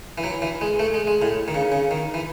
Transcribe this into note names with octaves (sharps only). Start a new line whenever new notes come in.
E3
F#3
E3
G#3
A3
G#3
G#3
A2
D#3
C#3
C#3
D#3
E3